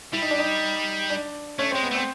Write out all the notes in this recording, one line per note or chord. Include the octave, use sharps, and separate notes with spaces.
G3 E4
D#4
D4
D#4
D4
A3 C#4
G#3 C4
B3
A3 C4